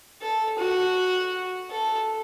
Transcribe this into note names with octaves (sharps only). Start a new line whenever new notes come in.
A4
F#4
A4